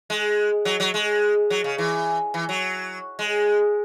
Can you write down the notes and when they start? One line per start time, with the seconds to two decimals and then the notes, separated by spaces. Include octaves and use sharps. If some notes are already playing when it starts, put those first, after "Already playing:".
0.10 G#3
0.65 F#3
0.80 F#3
0.94 G#3
1.50 F#3
1.64 C#3
1.78 E3
2.34 E3
2.49 F#3
3.19 G#3